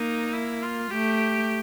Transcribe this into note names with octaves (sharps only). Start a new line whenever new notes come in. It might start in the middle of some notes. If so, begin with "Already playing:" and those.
Already playing: A#3 D#4
E4
F4
A3 G4